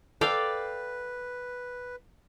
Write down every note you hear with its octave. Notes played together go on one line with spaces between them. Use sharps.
A4 B4 D5 F5 G5